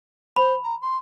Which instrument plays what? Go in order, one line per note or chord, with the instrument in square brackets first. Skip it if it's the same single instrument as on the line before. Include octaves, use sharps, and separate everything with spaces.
[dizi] C5 [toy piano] B5
[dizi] A#5
C6